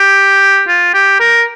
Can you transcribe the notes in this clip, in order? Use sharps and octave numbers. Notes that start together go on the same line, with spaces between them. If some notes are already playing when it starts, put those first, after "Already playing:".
Already playing: G4
F4
G4
A#4